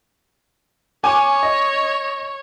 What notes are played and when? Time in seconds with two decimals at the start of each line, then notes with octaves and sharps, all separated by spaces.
1.04 C#5 G#5 D6
1.43 D#5